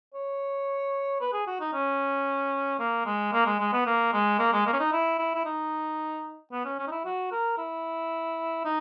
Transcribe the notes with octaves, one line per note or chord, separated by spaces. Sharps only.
C#5
B4
G#4
F#4
D#4
C#4
A#3
G#3
A#3
G#3
G#3
B3
A#3
G#3
A#3
G#3
A#3
C#4
D#4
E4
E4
E4
D#4
B3
C#4
C#4
D#4
E4
F#4
A#4
E4
D#4